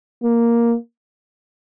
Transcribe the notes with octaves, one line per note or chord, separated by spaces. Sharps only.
A#3